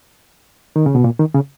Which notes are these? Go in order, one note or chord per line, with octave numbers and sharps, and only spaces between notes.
D#3
C#3
B2
A#2
D#3
C#3